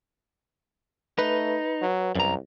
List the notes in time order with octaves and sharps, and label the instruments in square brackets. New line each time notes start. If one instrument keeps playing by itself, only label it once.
[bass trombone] A3 [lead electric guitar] D#4 [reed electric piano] B4
[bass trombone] F#3
[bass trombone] C2 [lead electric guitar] F#2 A#5